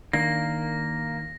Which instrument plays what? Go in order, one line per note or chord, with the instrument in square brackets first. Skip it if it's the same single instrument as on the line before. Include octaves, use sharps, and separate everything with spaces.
[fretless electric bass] D#3 D4 [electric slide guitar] A#3 [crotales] A#6